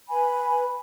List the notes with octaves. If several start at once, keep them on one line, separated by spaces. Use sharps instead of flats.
B4 G#5 B5